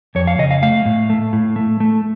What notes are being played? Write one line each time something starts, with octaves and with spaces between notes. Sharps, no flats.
F2 C#5
F5
C#3 D#5
F5
A3 F5
A2
A3
A2
A3
A3